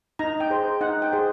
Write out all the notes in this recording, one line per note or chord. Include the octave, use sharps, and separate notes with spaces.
D#4 A#5
G5
G#4 C5
D#4 F#5
G5
G#4 C5